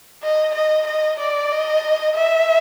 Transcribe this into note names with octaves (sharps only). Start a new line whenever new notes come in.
D#5
D#5
D#5
D5
D#5
E5